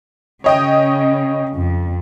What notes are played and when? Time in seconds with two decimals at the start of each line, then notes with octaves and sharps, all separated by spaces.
0.44 C#3 C#5 D#5 G5
1.55 F2